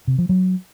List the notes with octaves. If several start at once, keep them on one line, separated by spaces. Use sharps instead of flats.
C3
F3
F#3